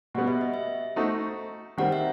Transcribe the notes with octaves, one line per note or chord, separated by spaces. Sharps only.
B2 G3 B3 F#5
E5
D#5
E5
A3 D#4 F#4 C5
D#3 G3 C4 F#5
E5